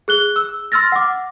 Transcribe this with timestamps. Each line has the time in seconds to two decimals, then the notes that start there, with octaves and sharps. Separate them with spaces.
0.08 G#4 F#6 G7
0.36 E6
0.72 C6 E6 F6 A6 A#6
0.92 F#5 D6